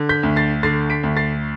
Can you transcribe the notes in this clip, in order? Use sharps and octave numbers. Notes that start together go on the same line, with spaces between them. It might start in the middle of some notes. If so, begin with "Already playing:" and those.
Already playing: D3
G6 B6
D2
A6 C7
D3 A6 C7
B6 D7
D2
A6 C7